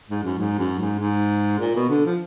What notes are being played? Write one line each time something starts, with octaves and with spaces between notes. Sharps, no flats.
G#2
F#2
G#2
F#2
G#2
G#2
A#2
B2
D3
F3